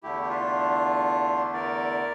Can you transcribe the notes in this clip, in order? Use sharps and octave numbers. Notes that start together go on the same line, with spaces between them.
E2 D3 A3 E4 G4
G4
D4 F4
A#4 D5